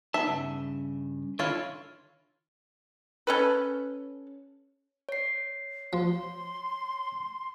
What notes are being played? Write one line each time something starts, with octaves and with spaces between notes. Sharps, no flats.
B3 D#4 E5 A5
G2 C#3
D3 D#3 E4 F4 C#5
C#4 A4 B4
C#5 C7
F3 C6